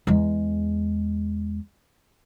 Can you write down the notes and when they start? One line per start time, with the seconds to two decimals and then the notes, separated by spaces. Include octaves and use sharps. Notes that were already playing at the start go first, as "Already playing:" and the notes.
0.07 E2 G#3